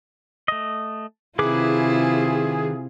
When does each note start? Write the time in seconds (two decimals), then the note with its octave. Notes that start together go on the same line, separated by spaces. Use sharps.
0.48 A3 D#5
1.39 C3 D#3 E4 F4 G#4 B4 D6